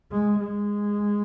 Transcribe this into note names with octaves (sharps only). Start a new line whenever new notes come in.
G#3
G#3